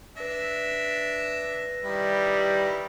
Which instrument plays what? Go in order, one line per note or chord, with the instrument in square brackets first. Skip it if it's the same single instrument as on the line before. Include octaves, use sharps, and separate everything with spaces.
[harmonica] D4 E5 [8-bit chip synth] B4 A#6
[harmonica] D#3 E4 [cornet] G3